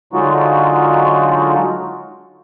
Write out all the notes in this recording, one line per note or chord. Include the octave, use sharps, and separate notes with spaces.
D3 F#3 G#3 D#4 F4 F#4